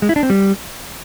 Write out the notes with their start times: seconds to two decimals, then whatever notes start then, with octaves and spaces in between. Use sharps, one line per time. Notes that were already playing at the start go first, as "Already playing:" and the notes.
0.02 G#3
0.09 E4
0.16 D4
0.23 C4
0.30 G3